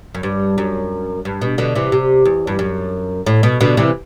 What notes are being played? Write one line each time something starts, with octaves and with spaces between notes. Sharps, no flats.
F#2
G2
F#2
G2
B2
B2 D3
C3 E3
C3
E2
G2
F#2
A2
B2
B2 D3
C3 E3